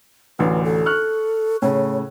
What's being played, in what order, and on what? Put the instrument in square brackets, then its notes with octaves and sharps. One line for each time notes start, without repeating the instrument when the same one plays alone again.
[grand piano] A1 D2 [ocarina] B4
[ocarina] A4
[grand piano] C#6 F6 F#6
[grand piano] A2 C#3 [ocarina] C#5